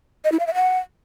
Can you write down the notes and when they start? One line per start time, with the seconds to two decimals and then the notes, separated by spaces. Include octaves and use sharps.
0.24 D#5
0.32 E4
0.39 F5
0.47 E5
0.54 F#5